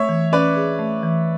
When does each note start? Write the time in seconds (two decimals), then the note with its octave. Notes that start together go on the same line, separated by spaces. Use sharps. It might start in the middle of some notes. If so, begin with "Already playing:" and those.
Already playing: A3 C#5 E5
0.09 E3
0.32 C#4 B4 D5
0.56 G#4
0.79 A3
1.03 E3